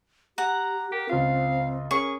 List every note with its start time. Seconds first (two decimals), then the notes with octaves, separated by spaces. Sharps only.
0.38 G4 F#5 A#5
0.92 G4 A#4
1.09 C#2 C4 F4 F5
1.91 C#4 G#4 A#4 C#6